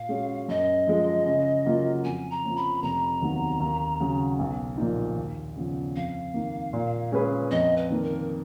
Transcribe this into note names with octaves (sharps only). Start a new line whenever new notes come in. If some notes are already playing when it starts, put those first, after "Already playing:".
Already playing: A#2 F5
G#3 C#4 F#4
F#2 D#5
F3 G#3
C#3
F#3 A#3 F4
F2 G#5
A#5
F3 A#3 C#4
B5
F1 A#5
D#2 D#3 F#3 B3
D#2
C#3 F#3
B1
A#2 F3 A#3 D#4
D#2
C#3 F3 B3
F2 F5
D#3 A#3
A#2
G#3 C#4 G#4 B4
F2 D#5
B4
D#3 A#3
A#4